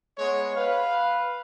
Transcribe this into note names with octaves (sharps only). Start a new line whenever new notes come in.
G#3 B3 C#5
B4 F5